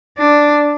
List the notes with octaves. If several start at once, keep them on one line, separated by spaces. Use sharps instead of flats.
D4